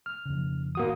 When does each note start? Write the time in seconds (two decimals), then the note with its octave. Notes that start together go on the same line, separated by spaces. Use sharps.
0.06 F6
0.25 F2 C#3
0.75 A2 D#3 A#3 F#4 D#6